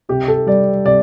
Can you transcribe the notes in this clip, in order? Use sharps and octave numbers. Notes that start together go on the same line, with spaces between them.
C3 G4
A4
G3 D5
C3 D5